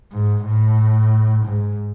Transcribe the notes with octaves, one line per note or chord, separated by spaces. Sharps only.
G#2
A2
G#2